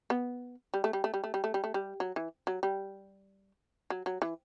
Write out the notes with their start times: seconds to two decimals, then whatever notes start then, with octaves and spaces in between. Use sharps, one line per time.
0.10 B3
0.74 G3
0.84 A3
0.93 G3
1.04 A3
1.14 G3
1.24 A3
1.34 G3
1.44 A3
1.54 G3
1.64 A3
1.74 G3
2.00 F#3
2.16 E3
2.47 F#3
2.63 G3
3.90 F#3
4.06 F#3
4.22 E3